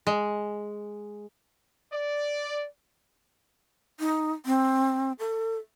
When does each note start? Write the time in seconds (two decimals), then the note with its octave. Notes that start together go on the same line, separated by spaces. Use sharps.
0.07 G#3
1.92 D5
4.00 D#4
4.46 C4
5.19 A4